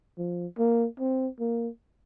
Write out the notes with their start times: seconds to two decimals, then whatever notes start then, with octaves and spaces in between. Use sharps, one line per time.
0.18 F3
0.58 A#3
1.00 C4
1.40 A#3